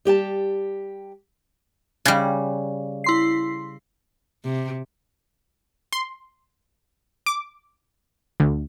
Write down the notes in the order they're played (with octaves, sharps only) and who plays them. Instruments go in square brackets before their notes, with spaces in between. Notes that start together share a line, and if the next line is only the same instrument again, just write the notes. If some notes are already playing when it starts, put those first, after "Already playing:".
[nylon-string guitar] G3 G4 G5 A5
[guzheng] C#3 G3
[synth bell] E4 C6 C7
[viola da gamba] C3
[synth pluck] C6
D6
D2